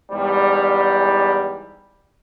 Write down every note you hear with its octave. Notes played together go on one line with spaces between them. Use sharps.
E2 G#2 G3